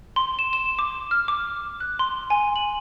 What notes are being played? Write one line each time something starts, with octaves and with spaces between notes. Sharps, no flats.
C6
E7
E7
D6
F6
D6
F#6
C6
G#5
F#7